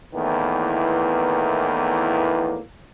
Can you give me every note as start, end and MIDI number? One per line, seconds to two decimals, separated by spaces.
0.13 2.59 40
0.13 2.59 45
0.13 2.59 51
0.13 2.59 52
0.13 2.59 58
0.13 2.59 59